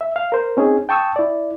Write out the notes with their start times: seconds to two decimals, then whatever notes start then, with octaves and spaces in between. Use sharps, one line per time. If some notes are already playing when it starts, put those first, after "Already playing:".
0.01 E5
0.16 F5
0.32 A#4 C5
0.57 C4 C#4 D#4 G#4
0.89 G5 A5 C#6 D#6 E6
1.16 E4 D5